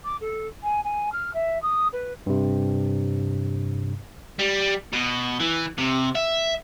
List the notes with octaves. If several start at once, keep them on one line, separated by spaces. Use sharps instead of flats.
D6
A4
G#5
G#5
F6
E5
D#6
B4
G2 C3
G3
B2
E3
C3
E5